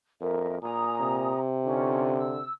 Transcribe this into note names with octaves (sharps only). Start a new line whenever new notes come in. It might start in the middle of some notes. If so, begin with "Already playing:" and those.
F2 A#4 E5
A#2 G#5 A#5 D#6
C3
D3 C#4 D#4 F4
E6